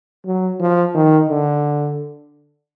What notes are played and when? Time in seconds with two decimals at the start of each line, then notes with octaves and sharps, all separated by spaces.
0.26 F#3
0.60 F3
0.94 D#3
1.29 D3